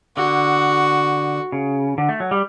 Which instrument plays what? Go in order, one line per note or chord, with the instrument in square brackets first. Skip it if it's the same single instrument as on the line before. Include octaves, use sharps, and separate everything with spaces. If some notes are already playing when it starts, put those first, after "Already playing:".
[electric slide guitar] D3 [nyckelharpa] F#4
[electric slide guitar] C#3
D3
A3
F#3
G3